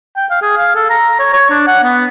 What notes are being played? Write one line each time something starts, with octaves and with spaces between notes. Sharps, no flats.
G5
F5
G#4
F5
A4
A#5
C#5
C#5
D4
F#5
B3